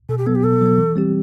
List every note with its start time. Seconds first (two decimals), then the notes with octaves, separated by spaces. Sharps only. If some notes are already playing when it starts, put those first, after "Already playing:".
0.09 B2 A4
0.18 G4
0.26 F#3 B3 A4
0.35 G4
0.44 B2 A4
0.61 F#3 B3
0.78 E3
0.96 G3 C4 G4